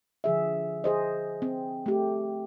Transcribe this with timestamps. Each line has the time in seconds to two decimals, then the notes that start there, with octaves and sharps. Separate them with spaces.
0.24 D3 F3 G#4 E5
0.84 G#4 C5 D#5
1.42 C4
1.86 A3 G4